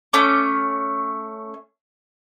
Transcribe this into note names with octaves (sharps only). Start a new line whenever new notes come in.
A3 C#4 D6